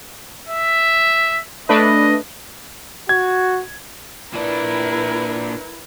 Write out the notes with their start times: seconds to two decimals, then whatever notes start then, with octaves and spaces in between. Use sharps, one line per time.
0.49 E5
1.69 A3 D4 B4 D#5
3.09 F#4 G#6
4.33 A#2 D4 E4 A#4 B4